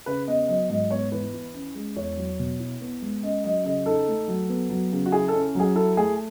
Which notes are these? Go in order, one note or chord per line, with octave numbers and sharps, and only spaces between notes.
C#3 B4
B3 D#5
F#3 D#5
G#2 D#5
B3 C#5
E3 B4
E4
C#4
G#3
E2 C#5
F#3
B2
E4
B3
G#3
C#4 D#5
F#3 D#5
C#3 D#5
D#4 A4
A3
F#3
B3
F#3
C#3
F#4
E4 G#4
C#4 A4
F#3 G#4
E4 A4
A3 G#4